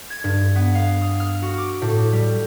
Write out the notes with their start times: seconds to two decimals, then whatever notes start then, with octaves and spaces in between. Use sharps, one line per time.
0.10 G#6
0.24 G2
0.56 B3
0.75 F5
1.02 D#6
1.20 F6
1.42 F#4
1.58 D6
1.82 A2
2.13 G3